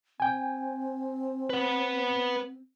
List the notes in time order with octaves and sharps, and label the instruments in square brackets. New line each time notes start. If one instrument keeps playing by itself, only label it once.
[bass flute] C4 [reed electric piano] G5 G#5
[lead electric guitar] B4 F#5